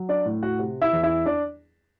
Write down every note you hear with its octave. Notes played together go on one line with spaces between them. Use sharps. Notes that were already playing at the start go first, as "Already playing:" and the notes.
Already playing: F#3
D4 D5
A2
F#4 F#5
C3
E4 E5
E2
E4 E5
D4 D5